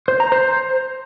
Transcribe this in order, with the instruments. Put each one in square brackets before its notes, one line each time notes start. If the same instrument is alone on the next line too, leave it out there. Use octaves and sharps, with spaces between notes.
[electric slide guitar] C5
A#5
C5